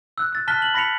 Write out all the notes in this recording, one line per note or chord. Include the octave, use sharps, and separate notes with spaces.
E6 F#6
E6 A6
A5 F6 F#6 A6 B6 G7
F#7
B5 A#6 B6 C#7 F7